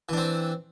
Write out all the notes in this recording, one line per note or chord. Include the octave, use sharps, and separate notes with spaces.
E3 C4 D4